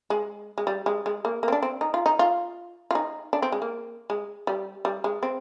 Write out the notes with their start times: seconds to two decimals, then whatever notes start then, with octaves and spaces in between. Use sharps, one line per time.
0.10 G#3
0.58 G#3
0.67 G3
0.86 G#3
1.06 G#3
1.25 A#3
1.43 A#3
1.48 C4
1.52 D4
1.62 C4
1.81 D#4
1.94 F4
2.06 D#4
2.19 F4
2.91 F4
2.95 D#4
3.33 D4
3.42 C4
3.52 G#3
3.62 A#3
4.10 G#3
4.47 G3
4.85 G3
5.04 G#3
5.23 C4